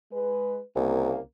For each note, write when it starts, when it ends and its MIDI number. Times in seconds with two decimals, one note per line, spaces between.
0.12 0.59 56
0.12 0.59 71
0.76 1.18 36
0.76 1.18 49
0.76 1.18 58